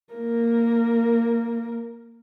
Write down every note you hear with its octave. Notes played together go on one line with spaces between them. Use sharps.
A#3 A#4